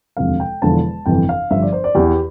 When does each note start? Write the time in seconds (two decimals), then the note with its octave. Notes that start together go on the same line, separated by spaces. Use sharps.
0.17 E1 D2 C3 F3 F5
0.40 G5
0.62 E1 E2 D3 F3 A5
1.06 G1 F2 C3 E3 G5
1.29 F5
1.51 G1 G2 F3 E5
1.62 D5
1.72 C5
1.84 D5
1.95 E2 E3 G4